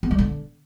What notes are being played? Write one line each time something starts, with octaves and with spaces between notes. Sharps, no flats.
B3
G3
D3